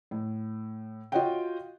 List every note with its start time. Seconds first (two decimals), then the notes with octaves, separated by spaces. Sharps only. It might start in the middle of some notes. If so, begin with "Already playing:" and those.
0.11 A2
1.12 F4 F#4 C#5 D#5 F#5 G5